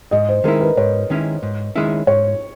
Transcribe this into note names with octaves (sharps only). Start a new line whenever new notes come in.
G#2 D#5
C5
D#3 G#3 C#4 E4 A#4
B4
G#2 C#5
D#3 G#3 C#4 E4
G#2
D#3 G#3 C#4 E4
G#2 C#5